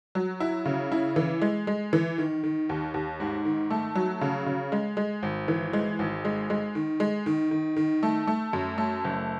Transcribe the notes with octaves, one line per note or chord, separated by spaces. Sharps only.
F#3
E4
C#3
E4
E3
G#3
G#3
E3
D#3
D#3
D#2
D#2
G#2
D#3
A3
F#3
C#3
C#3
G#3
G#3
G#1
E3
G#3
G#1
G#3
G#3
D#3
G#3
D#3
D#3
D#3
A3
A3
F#2
A3
F#1